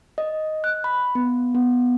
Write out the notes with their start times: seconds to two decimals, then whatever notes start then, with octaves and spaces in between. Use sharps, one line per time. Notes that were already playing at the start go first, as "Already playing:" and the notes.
0.18 D#5
0.64 F#6
0.84 B5
1.15 B3
1.55 B3